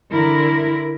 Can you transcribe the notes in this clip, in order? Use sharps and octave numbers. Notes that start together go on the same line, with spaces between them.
D3 E4 A#4